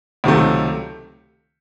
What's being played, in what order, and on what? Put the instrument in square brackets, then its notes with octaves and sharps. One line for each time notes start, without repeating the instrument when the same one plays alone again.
[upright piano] C#2 C3 D#3 F#3 A3